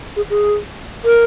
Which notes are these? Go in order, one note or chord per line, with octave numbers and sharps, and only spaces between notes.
G#4
G#4
A#4